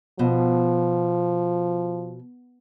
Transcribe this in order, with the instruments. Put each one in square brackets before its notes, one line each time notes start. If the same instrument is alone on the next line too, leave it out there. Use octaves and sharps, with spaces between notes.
[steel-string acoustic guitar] B2 [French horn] F3